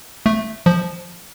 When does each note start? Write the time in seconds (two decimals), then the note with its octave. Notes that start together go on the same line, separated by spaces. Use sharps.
0.26 A3
0.66 F3